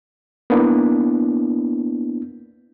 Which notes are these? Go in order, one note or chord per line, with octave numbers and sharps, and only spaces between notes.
A#3 B3 D4 E4